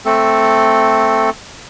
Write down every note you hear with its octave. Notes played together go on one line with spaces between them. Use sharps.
A3 C4 A4